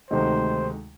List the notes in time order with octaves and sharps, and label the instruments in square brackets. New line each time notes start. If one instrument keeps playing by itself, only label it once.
[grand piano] D2 C3 D#3 [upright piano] G#3 A3 D#4 [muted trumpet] C5